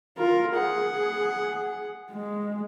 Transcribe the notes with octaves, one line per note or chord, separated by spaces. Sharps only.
F4 A#4
G#4 F#5
G#3